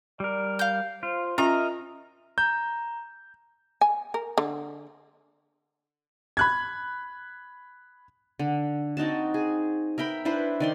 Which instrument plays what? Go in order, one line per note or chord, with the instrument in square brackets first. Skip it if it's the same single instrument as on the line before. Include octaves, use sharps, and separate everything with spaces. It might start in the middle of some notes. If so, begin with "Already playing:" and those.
[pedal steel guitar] G3 A#4 [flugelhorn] D5
[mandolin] F5 G6
[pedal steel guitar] F4 [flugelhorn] C5
[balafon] C#4 F4 [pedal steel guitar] A#4 D#5 [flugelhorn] E5 [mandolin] A#5
[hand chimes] A#5 [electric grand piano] G6
[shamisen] G#5
A#4
D3
[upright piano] B5 F#6 G#6
[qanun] D3
C4 D#4 F#4 A5
G#4
A#4 E5 G5 B5
D4 E4 B4 C5
D#3 D5 C6